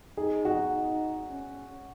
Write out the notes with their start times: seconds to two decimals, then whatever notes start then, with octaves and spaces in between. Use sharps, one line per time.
0.17 D#4 G#4
0.45 F#4
0.73 D#4
1.29 C#4